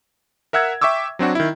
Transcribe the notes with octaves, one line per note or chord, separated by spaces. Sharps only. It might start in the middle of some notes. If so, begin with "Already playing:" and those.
A#4 E5 F#5 E6 G#6
E5 G5 C#6 D6 E6
F#3 C4 D4 F#4
D#3 E4